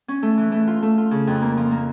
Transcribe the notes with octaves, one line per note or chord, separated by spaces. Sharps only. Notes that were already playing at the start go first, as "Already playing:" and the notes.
C#4
A3
E3
A3
F4
A3
F4
C#3
F2
A#3
F3
A#3